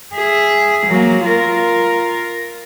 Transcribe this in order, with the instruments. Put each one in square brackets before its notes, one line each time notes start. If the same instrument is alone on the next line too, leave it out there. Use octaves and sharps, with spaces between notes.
[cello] G#4 E5
F#3 A#3
F4 A#4